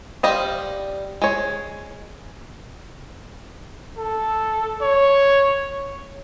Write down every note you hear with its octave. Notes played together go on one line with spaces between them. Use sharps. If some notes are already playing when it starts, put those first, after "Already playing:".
G3 C5 D#5 F5
G#3 C#5
A4
C#5